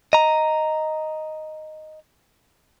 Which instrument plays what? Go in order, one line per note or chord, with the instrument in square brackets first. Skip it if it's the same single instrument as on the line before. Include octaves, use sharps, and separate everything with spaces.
[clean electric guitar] D#5 A#5